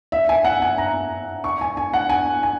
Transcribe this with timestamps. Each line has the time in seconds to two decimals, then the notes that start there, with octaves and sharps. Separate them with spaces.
0.12 E5
0.29 G#5
0.45 F#5
0.62 G#5
0.78 A#5
1.44 C#6
1.61 G#5
1.77 G#5
1.94 F#5
2.10 G#5
2.43 G#5